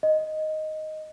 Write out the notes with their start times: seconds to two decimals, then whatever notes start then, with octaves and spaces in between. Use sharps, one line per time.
0.03 D#5